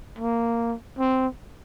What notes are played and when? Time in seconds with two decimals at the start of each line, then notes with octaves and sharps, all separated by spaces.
0.19 A#3
0.99 C4